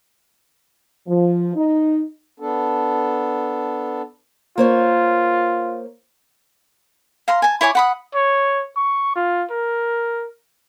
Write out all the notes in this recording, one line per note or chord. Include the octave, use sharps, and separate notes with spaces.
F3
D#4
B3 D4 A4
A#3 F4 C5 C#5
F5 A#5 C6
G#5 A5
E4 C#5 G#5 D6
F#5 B5 D#6
C#5
C#6
F4
A#4